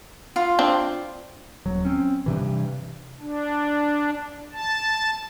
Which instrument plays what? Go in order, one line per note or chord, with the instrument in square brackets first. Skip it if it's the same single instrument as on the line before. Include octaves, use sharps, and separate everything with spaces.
[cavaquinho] F4
[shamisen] C4 D4
[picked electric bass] D#1 F#3
C4 C#4
G2 C3 E3
[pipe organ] D4
A5